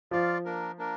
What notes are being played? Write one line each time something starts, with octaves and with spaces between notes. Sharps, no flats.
F3 F4 D5 F5
A#3 D4 A#4
A#3 D4 A#4